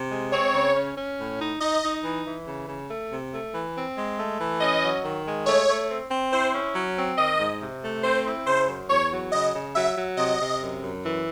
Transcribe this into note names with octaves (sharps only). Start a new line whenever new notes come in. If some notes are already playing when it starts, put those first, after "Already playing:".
Already playing: C3
G#3
C4 C#5
C#3
C#4
C#4
A2
D#4
D#4 D#5
D#4
E3
E3
C#3
C#3
A3
C3
A3
E3
C4
G#3
A3
E3
C#4 D#5
F#3
D#3
G#3
A3 C#5
A3
C4
C4
E4 C5
C#4
F#3
C4
D#3 D#5
G#2
C3
A3
C4 C5
E4
C#3 C5
F#2
E2 C#5
F#3
C#3 D#5
C#3
F#3 E5
F#3
C3 D#5
C3
F#2
F#2
E3